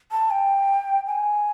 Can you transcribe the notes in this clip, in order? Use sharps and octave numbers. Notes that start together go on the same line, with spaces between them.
A5
G5
G#5